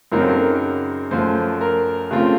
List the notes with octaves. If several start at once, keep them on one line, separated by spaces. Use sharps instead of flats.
F#2 C#3 F#3 C4 D#4 A#4
A4
A#4
F#2 F3 A3 C5
A#4
C#3 A3 C4 F4